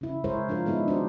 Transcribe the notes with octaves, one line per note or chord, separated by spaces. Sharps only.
C#3 E4
G#3 E4 G#4 A#4 C5 C#5
F3 D4 F4 A#4
D#3 G#3 B3 D#4 E4
D4 F#4 C5